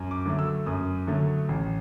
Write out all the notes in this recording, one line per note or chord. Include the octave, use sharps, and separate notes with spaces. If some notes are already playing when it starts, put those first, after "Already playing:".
Already playing: F#2
D6
D3 F#3 A3
E6
F#2 D#6
D3 F#3 A3
A1